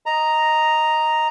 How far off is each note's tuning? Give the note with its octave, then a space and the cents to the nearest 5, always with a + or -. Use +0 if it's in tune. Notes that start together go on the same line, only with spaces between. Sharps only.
D#5 +0 A#5 +0